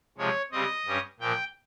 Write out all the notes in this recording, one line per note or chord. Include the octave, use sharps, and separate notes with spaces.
C3 F3 G#3 C#5
C#3 G3 C4 D#5
G2 G3 C#4
A#2 F3 A#3 G5